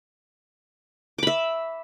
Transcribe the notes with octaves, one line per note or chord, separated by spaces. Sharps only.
E5 B5 D6